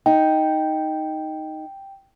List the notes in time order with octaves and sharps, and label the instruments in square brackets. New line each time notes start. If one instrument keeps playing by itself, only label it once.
[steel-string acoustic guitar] D#4 [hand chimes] G5